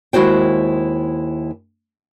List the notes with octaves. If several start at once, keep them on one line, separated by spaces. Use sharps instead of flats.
D#2 G#3 E4 F#4 C5 G5